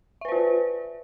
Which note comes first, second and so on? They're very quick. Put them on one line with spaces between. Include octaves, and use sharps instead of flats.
E5 B4 C5 F4